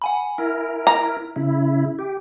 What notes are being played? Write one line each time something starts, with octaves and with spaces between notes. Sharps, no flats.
F#5 G#5 B5
E4 A#4
A#5
C#3 E4
G4